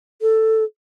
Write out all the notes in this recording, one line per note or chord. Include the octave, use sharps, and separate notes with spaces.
A4